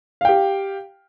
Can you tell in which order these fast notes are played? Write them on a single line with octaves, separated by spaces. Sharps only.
F5 G5 G4